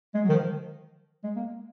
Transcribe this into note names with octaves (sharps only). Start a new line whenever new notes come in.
G#3
F#3
D#3
F3
G#3
A#3